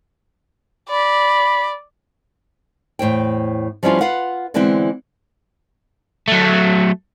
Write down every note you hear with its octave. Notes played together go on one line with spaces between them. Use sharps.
D5 B5
E2 A2 C5 G5
F3 G3 B3 C#4 E4 F4
F4 B4 F5 F#5
D3 E3 G#3 B3 C4 E4
F#3 A3